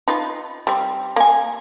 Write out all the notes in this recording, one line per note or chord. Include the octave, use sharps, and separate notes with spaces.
D#4 F4 B4
G3 C4
A#3 G#5